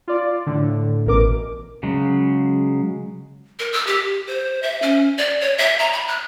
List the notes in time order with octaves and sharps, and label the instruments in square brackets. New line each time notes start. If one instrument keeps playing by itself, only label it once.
[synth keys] F4 D5
A2 D3
A1 B2 A#4 D6
[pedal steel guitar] C#3 F#3 G#3
[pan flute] A#4
E6
G4
C5
E5
C#4
D5
C#5
E5
A#5
B5
F#6